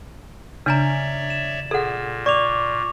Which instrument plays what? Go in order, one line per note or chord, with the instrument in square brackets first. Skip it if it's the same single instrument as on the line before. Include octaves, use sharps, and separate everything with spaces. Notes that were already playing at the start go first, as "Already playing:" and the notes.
[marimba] C#3 [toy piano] D4 G#5 A#5 [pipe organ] C#5 D5 E5
[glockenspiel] E7
[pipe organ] A#2 [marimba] G#4 [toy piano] A4 F#5
[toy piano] D5 [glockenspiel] C#6 D6 F7